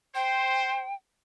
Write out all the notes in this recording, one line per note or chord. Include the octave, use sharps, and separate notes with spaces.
C5 G5